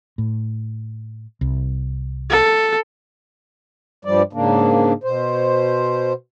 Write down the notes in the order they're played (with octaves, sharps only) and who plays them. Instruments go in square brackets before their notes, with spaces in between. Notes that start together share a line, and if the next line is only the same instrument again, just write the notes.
[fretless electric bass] A2
C2
[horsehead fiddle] A4
[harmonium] G2 F3 G3 D5
G#2 C#3 A#3 D4
B2 C5